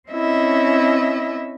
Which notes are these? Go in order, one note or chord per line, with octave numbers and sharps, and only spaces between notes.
C4 C#4 E4 D#5 E5